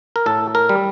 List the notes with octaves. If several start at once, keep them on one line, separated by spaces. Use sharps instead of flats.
A#4
A2 A4
A#4
G3